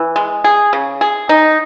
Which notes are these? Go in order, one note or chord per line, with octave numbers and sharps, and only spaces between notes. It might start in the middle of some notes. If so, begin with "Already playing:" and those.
Already playing: E3
G#3
G#4
C#3
G#4
D#4